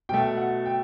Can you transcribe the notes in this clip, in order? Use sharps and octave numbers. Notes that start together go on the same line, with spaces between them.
B2 F#3 A3 G5
F#5
G5